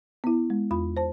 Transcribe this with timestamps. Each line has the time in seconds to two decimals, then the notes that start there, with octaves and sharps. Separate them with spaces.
0.24 B3 E4
0.50 G#3
0.71 E2 F4 B5
0.97 C5 A5